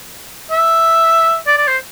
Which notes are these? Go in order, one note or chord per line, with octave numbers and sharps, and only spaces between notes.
E5
D5
D5
C5